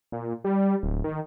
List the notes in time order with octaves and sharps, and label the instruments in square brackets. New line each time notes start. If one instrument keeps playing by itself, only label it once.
[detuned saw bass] A#2
G3
D1
D#3